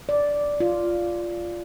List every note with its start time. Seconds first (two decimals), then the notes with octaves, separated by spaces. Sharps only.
0.09 D5
0.60 F4